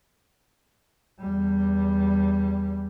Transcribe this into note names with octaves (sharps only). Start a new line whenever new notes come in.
E2 G3